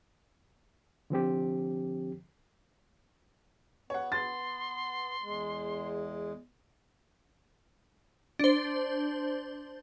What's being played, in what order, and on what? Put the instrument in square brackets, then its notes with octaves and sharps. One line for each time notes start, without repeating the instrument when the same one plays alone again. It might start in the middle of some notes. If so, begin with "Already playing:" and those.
[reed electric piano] D3 F3 C4 G4
[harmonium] B3 [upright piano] C#5 F#5
[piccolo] C6 [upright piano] A6
[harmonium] E2 G#3
[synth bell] D4 C5